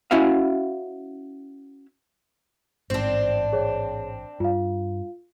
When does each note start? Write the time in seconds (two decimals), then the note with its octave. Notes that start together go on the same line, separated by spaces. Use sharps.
0.11 C#4 E4 F#4 E5 F5
2.90 A1 G#2 C4 D4
3.53 G#4 C#5
4.40 G2 F4 F5